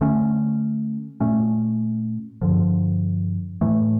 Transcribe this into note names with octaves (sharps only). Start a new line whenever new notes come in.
D3 A3 C#4
A#2 A3 C#4
G2 D3 F3
A2 E3 A3